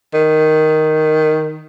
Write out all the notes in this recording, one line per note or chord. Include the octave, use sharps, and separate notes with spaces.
D#3